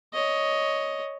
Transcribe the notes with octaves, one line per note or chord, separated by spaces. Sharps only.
C#5 D#5